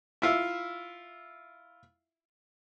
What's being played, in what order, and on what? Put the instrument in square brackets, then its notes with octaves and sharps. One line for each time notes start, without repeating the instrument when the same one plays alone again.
[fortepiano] E4 F4 E5